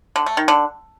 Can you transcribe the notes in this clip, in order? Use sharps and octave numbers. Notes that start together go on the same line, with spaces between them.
D3
A3
D#3
D3